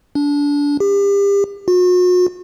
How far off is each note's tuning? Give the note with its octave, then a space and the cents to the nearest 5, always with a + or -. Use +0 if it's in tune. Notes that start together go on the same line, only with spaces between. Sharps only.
D4 -25
G4 +35
F#4 -40